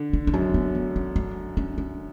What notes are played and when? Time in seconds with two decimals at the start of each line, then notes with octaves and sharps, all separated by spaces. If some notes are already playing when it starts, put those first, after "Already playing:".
Already playing: D3
0.13 D4
0.27 D4
0.34 F#2 C#4
0.54 B3
0.75 B3
0.96 C#4
1.16 D4
1.57 C#4
1.78 C#4